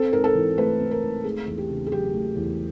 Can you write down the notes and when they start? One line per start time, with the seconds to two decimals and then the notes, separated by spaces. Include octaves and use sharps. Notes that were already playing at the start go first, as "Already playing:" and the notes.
Already playing: C4 A4
0.12 G#2 A#4
0.24 A4
0.34 E3
0.58 A3 B4
0.80 C4
0.91 A#4
1.02 G#2
1.24 A3 G#4
1.47 E2
1.58 G4
1.69 C#3
1.86 G#4
1.92 F#3 G4
2.14 A3
2.36 E2